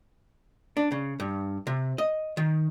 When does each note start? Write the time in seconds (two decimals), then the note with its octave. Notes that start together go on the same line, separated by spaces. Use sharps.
0.77 D4
0.92 C#3
1.20 G2
1.67 C3
1.98 D#5
2.37 D#3